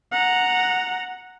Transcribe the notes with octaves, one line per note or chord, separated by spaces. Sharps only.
F#5 A#5